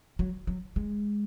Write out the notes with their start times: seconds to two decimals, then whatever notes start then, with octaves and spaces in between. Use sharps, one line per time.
0.19 F#3
0.47 F#3
0.76 G#3